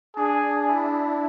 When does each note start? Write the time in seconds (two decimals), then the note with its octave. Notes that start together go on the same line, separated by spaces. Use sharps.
0.17 D4 G#4
0.69 E4